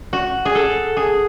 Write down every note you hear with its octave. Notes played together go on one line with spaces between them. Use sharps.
F#4
G#4
A4
G#4